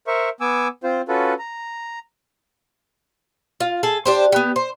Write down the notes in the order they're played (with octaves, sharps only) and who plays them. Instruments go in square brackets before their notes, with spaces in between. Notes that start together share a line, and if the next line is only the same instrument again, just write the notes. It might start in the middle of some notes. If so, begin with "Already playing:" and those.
[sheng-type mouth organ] A#4 C5 E5 C#6
B3 G#5 D6 E6
C4 F4 C5
C#4 F4 F#4 A4 B4
A#5
[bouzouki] F4
G#4 A4 A5
D4 G4 C5
B3 G4
C5